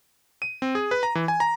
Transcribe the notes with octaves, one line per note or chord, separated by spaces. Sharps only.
D#7
C4
G#4
B4
A#5
E3
G#5
A#5